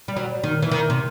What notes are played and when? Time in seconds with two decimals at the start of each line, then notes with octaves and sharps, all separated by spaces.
0.08 G3
0.17 F#3
0.43 D#3
0.62 E3
0.71 D#3
0.90 C3